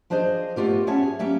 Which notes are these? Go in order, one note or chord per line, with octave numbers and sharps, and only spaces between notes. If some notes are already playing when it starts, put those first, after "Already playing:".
F3 D4 G#4 C5 D#5
A3 B3 F4 G4 A#4
B3 C#4 C#5 E5 A5
G#4
A#3 C#4 G4 E5